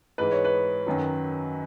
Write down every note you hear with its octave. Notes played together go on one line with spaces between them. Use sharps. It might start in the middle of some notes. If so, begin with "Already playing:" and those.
G#2 E3 G#3 B4
C#5
B4
F#2 D#3 F#3